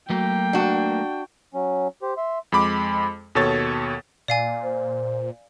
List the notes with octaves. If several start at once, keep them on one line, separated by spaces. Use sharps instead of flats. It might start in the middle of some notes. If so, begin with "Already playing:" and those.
F#3 A3 A#3 G5
D4 F#4
F#3 C#4
G4 C5
E5 C6
F2 G#3 B5 D6
D#2 B2 A4 C#5 A6
A#2 D5 F5 G#5
C5